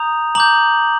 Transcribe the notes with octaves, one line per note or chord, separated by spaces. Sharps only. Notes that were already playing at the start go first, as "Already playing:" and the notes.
Already playing: A#5 D#6 G6 F7
A#5 D6 G6 F#7